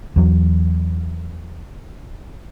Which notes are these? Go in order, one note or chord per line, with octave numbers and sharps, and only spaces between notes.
E2 F#3